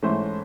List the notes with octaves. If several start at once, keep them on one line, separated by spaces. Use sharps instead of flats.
G#2 E3 A3 C#4 C5